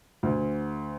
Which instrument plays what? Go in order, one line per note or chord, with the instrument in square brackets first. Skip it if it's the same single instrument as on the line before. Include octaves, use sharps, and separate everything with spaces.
[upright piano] D2